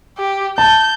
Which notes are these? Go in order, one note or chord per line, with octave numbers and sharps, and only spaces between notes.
G4
A5 G6